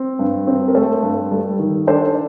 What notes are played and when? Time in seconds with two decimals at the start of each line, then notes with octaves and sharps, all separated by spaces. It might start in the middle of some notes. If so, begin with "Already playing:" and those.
Already playing: C4
0.19 G2
0.47 C4
0.68 A#4
0.75 A3 A4 C5
1.03 G2
1.31 G3 A4
1.59 D#3
1.87 D4 A4 C5